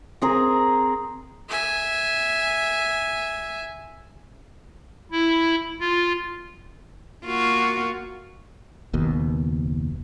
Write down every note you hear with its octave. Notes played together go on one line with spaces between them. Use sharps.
C4 G#4 A#4
E5 G#5
E4
F4
A#3 F4 F#4
F#1 D#2 B2